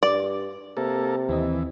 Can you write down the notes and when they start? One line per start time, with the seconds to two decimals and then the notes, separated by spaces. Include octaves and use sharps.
0.03 G2 D5
0.77 C3 A#3 A4
1.29 D#2 E3 C4 D#5